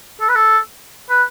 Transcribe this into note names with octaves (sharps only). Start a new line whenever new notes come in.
A4
B4
A4
B4